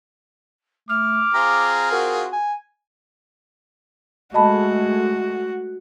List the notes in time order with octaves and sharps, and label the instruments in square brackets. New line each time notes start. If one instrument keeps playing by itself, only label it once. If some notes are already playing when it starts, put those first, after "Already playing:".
[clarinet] A3 [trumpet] D6 [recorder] F6
[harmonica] C4 F4 G#4 [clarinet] A#5
[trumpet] F#4 [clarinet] A#4
[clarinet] G#5
[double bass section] G#3 A3 [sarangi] F#4 [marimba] D#5 A5 B5